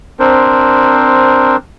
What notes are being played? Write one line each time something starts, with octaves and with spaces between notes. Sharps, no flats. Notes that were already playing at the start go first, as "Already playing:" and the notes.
C4 D4 A#4 C5